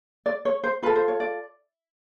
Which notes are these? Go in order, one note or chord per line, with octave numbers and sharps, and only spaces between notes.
D5
C#5
C5
F4 A4 B4
C5
C#5
D5